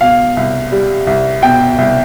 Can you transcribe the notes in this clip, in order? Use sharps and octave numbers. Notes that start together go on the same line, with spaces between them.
B2 F5
C2
G3
C2
B2 G5
C2